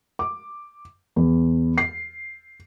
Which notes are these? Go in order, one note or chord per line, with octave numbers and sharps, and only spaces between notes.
D6
E2
C7